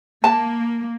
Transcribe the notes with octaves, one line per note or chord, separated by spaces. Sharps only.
A#3 A5